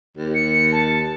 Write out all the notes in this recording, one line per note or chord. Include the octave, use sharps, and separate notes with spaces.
D#2
C#7
A5